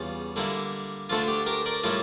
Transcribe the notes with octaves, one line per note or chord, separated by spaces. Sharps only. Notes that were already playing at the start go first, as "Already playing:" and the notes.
Already playing: E2 C#3 G3 F4
D3 G3 A#3 E4
D2 D3 A3 D4 F4
G4
G4 A#4
A#4 D5
A2 G3 A#3 E4 F4